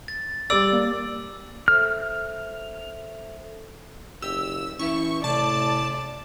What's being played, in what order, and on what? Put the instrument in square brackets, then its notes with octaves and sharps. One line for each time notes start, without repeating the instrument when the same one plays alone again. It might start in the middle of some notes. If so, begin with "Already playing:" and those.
[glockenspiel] A6
[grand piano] G3 A6 [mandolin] D5 [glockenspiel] E6
[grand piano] A#3
[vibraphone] A4 C5 E5 [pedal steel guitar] F6
[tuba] F#1 [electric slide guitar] G4 [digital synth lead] E6
[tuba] E3 [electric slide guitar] C#4 E4 E5 [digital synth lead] C#6
[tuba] A2 [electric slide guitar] C3 [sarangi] D5 [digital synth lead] A5